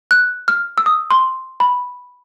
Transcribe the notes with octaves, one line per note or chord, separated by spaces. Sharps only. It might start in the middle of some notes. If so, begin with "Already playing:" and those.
F#6
F6
E6
D#6
C6
B5